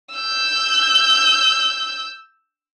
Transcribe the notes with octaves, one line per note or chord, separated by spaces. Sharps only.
E6 G6